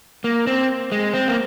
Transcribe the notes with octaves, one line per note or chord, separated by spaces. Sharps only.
A#3
C4
G#3
C4
A#3